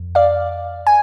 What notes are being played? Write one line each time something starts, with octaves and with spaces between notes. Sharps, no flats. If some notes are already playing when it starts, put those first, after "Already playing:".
Already playing: F2
D5 F5
G#5